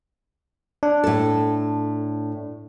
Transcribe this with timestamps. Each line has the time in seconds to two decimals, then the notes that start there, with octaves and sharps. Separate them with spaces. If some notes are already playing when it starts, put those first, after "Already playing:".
0.83 D4
1.04 A2 A4